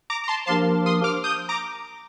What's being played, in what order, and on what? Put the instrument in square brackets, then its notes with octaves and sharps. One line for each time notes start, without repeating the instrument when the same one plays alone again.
[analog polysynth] A#5 D6
A#5
A5 C6
[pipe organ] F3 A#3 D4 G4 A#4 [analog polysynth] A5 C6
[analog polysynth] C6 D#6
D6 F6
D#6 G6
A#5 D6